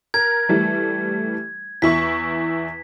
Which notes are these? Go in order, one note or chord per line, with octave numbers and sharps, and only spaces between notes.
A#4 G#6
E3 G3 A3
E2 E4 C#6 B6